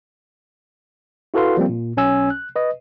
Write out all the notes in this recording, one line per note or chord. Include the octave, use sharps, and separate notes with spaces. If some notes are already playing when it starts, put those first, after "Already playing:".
E4 F#4 A4 B4 F5 C6
F3 G3 A#3 C4
A#2
B1 C#4 G#5 E6
F#6
B4 D#5